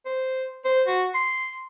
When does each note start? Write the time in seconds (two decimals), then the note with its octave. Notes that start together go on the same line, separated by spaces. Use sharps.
0.06 C5
0.65 C5
0.87 F#4
1.14 C6